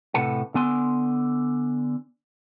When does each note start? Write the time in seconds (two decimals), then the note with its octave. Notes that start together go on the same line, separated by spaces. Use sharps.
0.14 A2 C3 A4 B4 F#5
0.54 D3 B3 G#5 C6